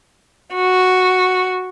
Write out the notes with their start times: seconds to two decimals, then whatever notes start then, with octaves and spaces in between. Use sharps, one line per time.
0.54 F#4